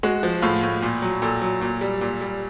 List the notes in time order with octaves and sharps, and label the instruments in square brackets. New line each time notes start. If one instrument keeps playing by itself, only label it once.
[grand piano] G#3 F#4
F3
A2 F4
A2
A#2
F#3
A#2 A4
F#3
A#2
G3
A#2
G3